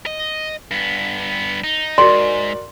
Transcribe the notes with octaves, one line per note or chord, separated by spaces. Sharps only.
D#5
G2 B3
D#4
G#2 F#4 A#4 D5 C6